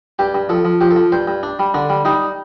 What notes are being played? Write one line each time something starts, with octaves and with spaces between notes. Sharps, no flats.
G2 G4
G2
F3 A4
F3
F3 G4
A4
F3
G2 C5
G2
D4
G3
D3 D4
G3
G3 D#4